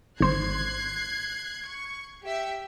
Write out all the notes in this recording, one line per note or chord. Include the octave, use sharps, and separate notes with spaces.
G#1 C5 F#6 G#6 C7
C#6
G4 E5